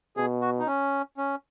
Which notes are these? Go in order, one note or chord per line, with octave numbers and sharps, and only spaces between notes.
B2 G#4
F#4
D#4
C#4
C#4